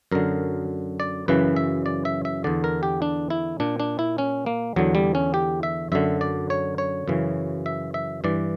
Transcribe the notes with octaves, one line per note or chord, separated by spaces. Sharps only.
F#2 D3 A#4
D5
F#2 C#3 E3 B4
E5
D5
E5
E5
E2 D3 D5
A#4
G4
D4
E4
A#2 D4
D4
E4
C#4
A#3
E2 D3 F#3
G3
C#4
G4
E5
F#2 D3 E5
D5
C#5
C#5
F#2 C#3 E3
E5
E5
G2 E3 D5